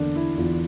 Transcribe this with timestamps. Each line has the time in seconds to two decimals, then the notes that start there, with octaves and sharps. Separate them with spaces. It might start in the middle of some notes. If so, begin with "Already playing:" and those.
Already playing: E2 D3 A#3 D4
0.15 E4
0.37 E2 F4